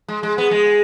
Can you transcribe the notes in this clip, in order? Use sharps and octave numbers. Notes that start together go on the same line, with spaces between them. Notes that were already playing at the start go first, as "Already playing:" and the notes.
G#3
G#3
B3
G#3